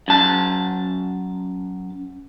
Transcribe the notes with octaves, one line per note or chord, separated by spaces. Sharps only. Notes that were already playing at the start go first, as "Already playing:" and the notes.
F#2 A5